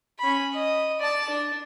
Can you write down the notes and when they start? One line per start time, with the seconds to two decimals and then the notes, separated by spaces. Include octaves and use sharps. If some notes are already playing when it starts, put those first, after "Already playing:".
0.19 C#4 B5
0.54 D#5
1.00 D5 A5
1.29 D4